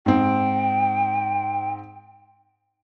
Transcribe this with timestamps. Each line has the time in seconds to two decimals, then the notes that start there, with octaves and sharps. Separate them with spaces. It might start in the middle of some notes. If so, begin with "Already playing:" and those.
0.06 G#2 C4 G5